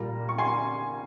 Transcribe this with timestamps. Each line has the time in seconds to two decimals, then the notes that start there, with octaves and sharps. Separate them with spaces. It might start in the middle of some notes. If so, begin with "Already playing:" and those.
Already playing: A#2 G3 A#3 A#5
0.29 C#6
0.38 G#5 C6